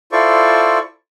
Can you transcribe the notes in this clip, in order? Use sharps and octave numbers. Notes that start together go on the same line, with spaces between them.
E4 F4 A4 C5 D5 C#6